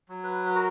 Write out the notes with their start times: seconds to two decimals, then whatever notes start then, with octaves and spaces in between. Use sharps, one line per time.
0.09 F#3
0.24 B4
0.46 B4
0.55 F#4 A#4